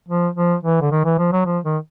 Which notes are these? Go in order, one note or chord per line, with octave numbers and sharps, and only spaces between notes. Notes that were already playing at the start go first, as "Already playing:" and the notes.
F3
F3
E3
D3
D#3
E3
F3
F#3
F3
D#3